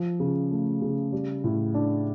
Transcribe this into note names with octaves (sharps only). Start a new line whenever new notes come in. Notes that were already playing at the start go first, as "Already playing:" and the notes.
Already playing: F3
C#3
A3
C#3
G3
A2
D4